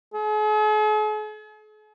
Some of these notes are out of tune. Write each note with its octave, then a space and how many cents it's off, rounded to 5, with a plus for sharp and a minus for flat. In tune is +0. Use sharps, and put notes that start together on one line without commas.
G#4 +45